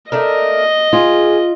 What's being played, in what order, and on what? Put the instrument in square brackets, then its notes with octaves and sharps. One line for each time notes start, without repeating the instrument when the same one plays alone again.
[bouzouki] A3 D4 A#4 [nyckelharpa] D#5
[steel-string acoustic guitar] F4 [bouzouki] G#4